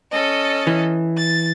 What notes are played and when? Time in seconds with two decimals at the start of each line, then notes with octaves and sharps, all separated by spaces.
0.12 C#4 A4 D#5
0.67 E3
1.16 A6